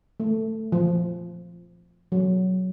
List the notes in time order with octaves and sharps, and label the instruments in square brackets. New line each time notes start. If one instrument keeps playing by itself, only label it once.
[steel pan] A3
F3
F#3